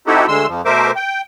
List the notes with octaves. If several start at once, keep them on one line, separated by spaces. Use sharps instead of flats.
C4 D#4 E4 F#4 G4 A4
D2 D3 G#3 C6 E6
F2 F3
B2 A3 A#4 C5 E5 D6
G5